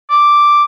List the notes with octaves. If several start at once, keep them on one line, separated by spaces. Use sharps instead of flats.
D6